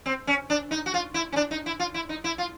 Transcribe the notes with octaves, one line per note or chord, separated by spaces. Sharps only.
C4
C#4
D4
D#4
F#4
F4
E4
C#4
D4
D#4
E4
F4
E4
D#4
E4
F4